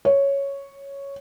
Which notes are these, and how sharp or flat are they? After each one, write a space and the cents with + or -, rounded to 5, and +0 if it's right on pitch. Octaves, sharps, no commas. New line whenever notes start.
C#5 +0